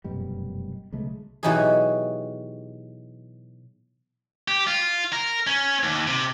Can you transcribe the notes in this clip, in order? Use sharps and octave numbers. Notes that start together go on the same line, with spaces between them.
F1 F#2 B2 G3
B1 C#3 G#3 A3
B2 E3 F#3 D#4 G4 G#4
G4
F4
A#4
C#4
D#2
C3